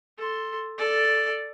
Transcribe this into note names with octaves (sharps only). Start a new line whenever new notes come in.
A4 C6
A4 D5